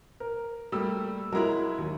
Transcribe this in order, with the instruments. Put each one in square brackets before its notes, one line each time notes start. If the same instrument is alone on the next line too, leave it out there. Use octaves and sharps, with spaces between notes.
[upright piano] A#4
[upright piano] G3 A#3 E6 [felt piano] A3 G4
[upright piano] F#3 G#3 E4 [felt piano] A#4 A#5 B5
[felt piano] D#2